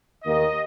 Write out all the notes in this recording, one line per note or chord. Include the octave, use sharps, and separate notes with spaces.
D#2 D#3 A#3 D#5